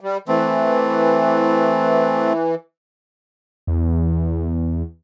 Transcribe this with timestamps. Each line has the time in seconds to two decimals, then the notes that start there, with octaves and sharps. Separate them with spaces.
0.01 G3
0.28 E3 A3 C4
3.67 E2